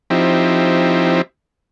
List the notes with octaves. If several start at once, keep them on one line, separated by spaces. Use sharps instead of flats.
F3 C4 D#4 E4 G4